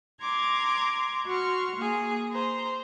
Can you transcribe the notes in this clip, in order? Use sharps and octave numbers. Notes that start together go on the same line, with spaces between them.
A#5 C6 D6 G#6
F#4 C6 C#6 F6
A#3 G#4
C5 A#5 C6